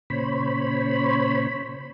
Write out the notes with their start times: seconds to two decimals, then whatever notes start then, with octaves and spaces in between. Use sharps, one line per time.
0.10 A#2 C#3 C5 C#5 B5